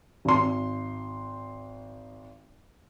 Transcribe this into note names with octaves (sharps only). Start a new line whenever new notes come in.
G#1 C6